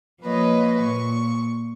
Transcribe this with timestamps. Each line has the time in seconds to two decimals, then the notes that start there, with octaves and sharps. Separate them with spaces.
0.22 F3 A#3 B4 C#5 D#5
0.82 A#2 C#6